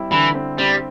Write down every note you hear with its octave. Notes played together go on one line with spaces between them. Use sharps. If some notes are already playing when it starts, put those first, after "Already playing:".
Already playing: G3 C4 E4
D3 E3
C4
G3 C4